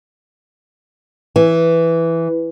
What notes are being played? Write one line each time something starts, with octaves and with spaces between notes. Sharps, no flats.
E3